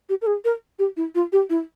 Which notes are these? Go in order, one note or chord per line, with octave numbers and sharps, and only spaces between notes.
G4
A#4
G#4
A#4
G4
E4
F4
G4
E4